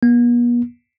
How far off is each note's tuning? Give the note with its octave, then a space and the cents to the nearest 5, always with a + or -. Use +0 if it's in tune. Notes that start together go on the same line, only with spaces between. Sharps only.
B3 -45